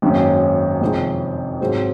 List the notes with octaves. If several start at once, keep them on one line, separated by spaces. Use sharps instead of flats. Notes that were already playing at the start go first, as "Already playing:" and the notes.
G#1 F#2 D#3 A#3 C#4
F2 C3 D#3 G#3
G#2 F#3 C4